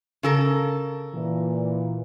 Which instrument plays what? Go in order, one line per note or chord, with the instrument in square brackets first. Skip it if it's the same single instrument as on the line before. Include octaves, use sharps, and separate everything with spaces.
[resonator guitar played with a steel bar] C#3 A4 A#4
[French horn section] A#2 E3